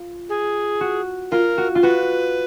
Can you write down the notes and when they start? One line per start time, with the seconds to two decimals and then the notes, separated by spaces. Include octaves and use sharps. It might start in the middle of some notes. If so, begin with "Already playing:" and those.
Already playing: F4
0.29 G#4
0.81 F#4
1.31 F4 A#4
1.58 F#4
1.75 F4
1.82 F#4 B4